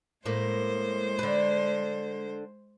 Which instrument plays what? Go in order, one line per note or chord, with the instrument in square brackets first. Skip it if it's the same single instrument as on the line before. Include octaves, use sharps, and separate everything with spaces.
[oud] A2 A#3 [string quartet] G#3 C5
[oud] D3 B4